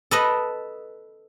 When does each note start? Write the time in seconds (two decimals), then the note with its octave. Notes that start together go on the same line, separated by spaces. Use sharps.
0.11 A4 B4 D#5